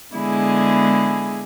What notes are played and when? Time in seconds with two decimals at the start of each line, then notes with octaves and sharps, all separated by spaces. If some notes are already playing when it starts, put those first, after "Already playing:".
0.13 D3 G#3 B3 E4 G#4